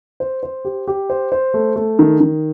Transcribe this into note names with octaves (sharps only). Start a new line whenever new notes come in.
C5
C5
G4
G4
C5
C5
A3
A3
D#3
D#3